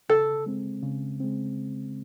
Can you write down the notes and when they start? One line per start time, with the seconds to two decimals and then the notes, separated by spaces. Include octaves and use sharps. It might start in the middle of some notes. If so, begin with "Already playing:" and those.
0.09 C#3 A4
0.46 G#3 C4
0.83 C#3
1.20 G#3 C4